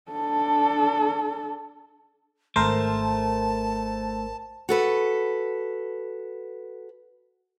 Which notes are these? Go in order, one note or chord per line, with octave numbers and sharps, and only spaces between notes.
D4 A4
G#1 A3 A#4 C5 A5
F#4 A4 B4